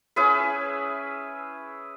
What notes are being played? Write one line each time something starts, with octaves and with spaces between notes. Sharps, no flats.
C#4 E4 G#4 B4